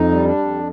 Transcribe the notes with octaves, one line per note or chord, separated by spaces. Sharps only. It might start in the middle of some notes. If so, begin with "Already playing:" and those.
Already playing: F2 D#4
G3
D4
F2